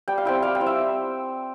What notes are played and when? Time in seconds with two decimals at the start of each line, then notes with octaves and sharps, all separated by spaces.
0.08 G3 G5
0.18 F5
0.25 C4 E4 G5
0.43 G3 F5
0.55 G5
0.61 C4 E4
0.66 E5